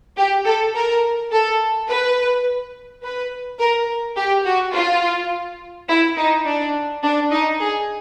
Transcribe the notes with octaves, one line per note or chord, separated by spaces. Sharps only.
G4
A4
A#4
A4
B4
B4
A#4
G4
F#4
F4
E4
D#4
D4
D4
D#4
G#4